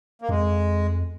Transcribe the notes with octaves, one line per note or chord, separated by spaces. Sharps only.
A#3
F2 G#3